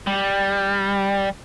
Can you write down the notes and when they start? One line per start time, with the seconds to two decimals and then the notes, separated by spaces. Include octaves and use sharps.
0.07 G3